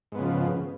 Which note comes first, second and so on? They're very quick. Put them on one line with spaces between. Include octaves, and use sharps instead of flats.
G#2 B3 C#3 F3